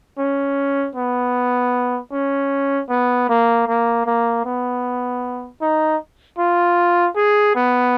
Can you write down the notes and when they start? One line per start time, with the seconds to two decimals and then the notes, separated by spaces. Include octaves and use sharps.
0.19 C#4
0.95 B3
2.12 C#4
2.89 B3
3.29 A#3
3.67 A#3
4.06 A#3
4.45 B3
5.62 D#4
6.38 F4
7.16 G#4
7.55 B3